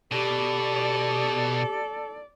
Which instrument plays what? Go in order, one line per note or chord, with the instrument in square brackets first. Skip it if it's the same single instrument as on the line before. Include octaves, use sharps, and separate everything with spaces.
[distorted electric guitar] B2 [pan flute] G4 [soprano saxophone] A4 [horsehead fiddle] D5